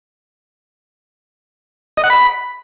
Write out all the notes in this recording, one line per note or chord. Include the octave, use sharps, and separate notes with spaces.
D#5
F#5
B5